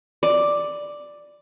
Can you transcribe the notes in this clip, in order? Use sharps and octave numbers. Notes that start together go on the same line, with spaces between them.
D5